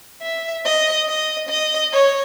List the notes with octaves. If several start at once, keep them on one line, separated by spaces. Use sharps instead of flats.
E5
D#5
D#5
D#5
C#5